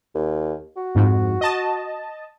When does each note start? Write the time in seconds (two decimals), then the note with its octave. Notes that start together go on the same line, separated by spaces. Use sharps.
0.15 D#2
0.77 F#4
0.95 F2 G#2
1.41 D#5 A5